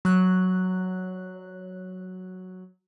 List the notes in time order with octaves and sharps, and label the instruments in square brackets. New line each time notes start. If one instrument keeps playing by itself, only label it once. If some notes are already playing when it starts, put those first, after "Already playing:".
[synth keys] F#3 F#6